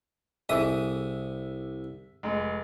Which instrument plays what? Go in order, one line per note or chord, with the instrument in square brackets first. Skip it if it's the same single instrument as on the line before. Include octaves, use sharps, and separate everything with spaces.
[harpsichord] C2 D#6 [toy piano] G#4 A4 G#5 [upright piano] E5
[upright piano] F1 G#3